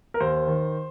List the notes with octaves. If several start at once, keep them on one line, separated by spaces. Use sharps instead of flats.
A#4
D#2 C5
D#3